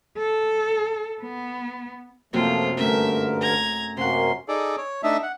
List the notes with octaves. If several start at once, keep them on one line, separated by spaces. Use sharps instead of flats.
A4
B3
F#2 C3 F3 A3 A#3 F4
G2 D3 A3 C#4 A#4 E5
A#5 G#6
F#2 C3 A#3 C#4 F#5 C6
D#4 G#4 A4 D5
C#5
A3 D4 D#4 E5
F#5